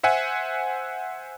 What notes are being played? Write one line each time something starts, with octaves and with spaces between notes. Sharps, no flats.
C5 E5 F#5 G#5